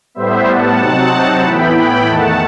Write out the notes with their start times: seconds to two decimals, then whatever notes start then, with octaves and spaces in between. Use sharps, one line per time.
0.14 A2 G3 B3 C5 E5
0.47 F#5 A5
0.79 C3 F#3 C4 D#4
1.43 A2 E3 B3 E4 G5 B5
1.75 G5 B5
2.07 E2 D#3 A3 F#5 A5